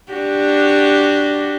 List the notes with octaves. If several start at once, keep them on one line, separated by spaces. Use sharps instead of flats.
D4 F#4 G4